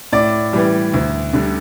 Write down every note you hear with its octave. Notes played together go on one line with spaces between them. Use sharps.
A2 D5
E3 G3
D2
D3 G3